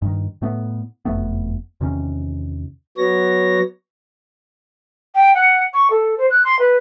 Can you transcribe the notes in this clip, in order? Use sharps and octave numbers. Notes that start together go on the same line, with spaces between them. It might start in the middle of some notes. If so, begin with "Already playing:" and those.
G2 D#3
A2 A3 B3
F#1 F2 A3 B3
E2 C3 D#3 C#4
F#3 B3 C#5 A#6
G5
F#5
C#6
A4
C5
F#6
C6
B4